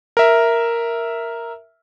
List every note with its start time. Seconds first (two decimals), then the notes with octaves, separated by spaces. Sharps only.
0.17 A#4 E5